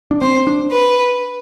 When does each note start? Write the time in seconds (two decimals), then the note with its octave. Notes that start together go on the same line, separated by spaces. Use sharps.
0.11 D4
0.21 C4 C5
0.47 D4
0.71 B4